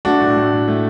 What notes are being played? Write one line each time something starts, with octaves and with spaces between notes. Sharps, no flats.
A3 D4 F#4
A2
A2
A2
A3